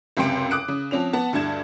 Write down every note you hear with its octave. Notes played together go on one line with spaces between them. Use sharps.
C#2 F#2 C3 G5 C6 D7
D6 D#6 F#6 D7
C#3
F3 C4 C#4 F7
B3 F#5 A5
D2 G2 A5 G#6 E7